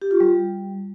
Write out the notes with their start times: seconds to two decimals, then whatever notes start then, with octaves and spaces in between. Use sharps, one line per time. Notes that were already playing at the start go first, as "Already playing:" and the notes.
0.02 G4
0.11 F4
0.20 G3